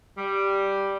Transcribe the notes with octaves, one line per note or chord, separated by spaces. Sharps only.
G3